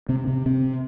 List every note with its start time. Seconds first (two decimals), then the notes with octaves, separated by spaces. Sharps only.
0.09 C3 C4
0.27 C3
0.46 C3 C4